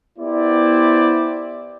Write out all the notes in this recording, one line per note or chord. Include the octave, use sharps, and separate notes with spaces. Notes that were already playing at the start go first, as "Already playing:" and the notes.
B3 E4 G4 C5 D5